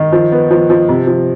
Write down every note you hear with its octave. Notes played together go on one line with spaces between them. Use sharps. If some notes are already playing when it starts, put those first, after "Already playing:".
Already playing: D#3
F3
B3
F3
F3
C3
F3